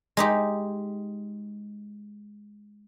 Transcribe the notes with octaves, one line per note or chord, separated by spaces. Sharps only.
G#3 D#4 G4